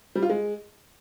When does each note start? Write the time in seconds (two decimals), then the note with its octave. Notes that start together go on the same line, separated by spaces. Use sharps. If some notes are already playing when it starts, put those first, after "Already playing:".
0.15 G3
0.22 F4
0.29 G#3